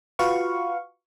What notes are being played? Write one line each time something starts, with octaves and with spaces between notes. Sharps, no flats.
F4 F#4 B4 F5 C#6